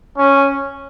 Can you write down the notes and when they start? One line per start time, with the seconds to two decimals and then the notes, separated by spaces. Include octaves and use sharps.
0.18 C#4